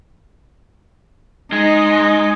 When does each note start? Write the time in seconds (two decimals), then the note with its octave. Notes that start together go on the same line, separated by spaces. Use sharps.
1.53 G#3 D#4